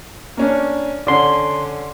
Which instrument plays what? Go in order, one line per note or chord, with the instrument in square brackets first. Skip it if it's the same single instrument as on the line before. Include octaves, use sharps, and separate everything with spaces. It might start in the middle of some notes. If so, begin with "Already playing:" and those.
[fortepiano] A#3 C#4 D4
[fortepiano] D3 C#4 [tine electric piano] D5 C6